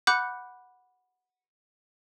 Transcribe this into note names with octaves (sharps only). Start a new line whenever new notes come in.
F#5 B5 D6 F#6 G6 C#7